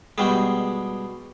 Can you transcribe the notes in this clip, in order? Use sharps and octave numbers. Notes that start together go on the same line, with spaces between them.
B2 G3 G#3